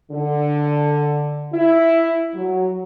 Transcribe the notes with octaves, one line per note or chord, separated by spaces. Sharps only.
D3
E4
F#3